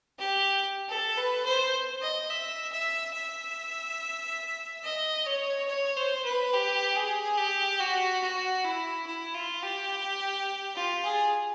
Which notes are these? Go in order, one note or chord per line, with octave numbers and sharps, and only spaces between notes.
G4
A4
B4
C5
D#5
E5
E5
E5
D#5
C#5
C#5
C5
B4
G4
G#4
G4
F#4
F#4
E4
E4
F4
G4
F4
G#4